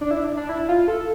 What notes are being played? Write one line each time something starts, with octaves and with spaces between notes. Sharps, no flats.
D4
E4
D4
D4
E4
F4
A4